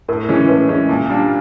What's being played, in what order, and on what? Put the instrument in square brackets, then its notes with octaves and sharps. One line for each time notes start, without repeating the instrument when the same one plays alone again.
[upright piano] A2 [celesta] A#4
[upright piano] E3 G#3 C#4
[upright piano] A2 [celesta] B4
[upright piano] E3 G#3 C#4
A#2
G3 A#3 D4 F4